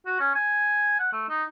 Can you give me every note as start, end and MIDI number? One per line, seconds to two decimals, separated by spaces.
0.06 0.16 66
0.20 0.30 61
0.35 0.99 80
0.99 1.08 78
1.13 1.26 57
1.29 1.43 63